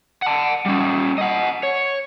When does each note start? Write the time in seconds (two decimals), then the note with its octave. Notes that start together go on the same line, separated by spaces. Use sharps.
0.22 F#5 A5
0.66 G3 C#4
1.18 D#5 F#5
1.63 C#5